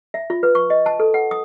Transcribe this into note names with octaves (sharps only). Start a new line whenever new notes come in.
E5
F4
B4
C#6
D#5
A5
A4
F#5
D#6